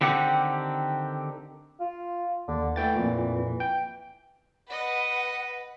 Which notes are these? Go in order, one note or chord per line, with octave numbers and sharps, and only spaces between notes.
D3 D#3 C4 G4 F#5
F4
D#2 D3
E3 A3 G5 A6
F2 A#2
G5
B4 D#5 F#5